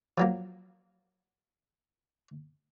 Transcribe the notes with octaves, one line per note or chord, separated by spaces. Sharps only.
F3 F#3 A#3